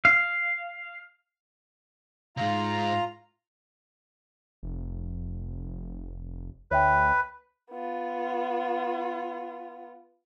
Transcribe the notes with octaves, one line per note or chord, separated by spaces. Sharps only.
F5
C2 G#2 F4 A#5
F1
D2 B4 C#5 E5 G5
B3 F4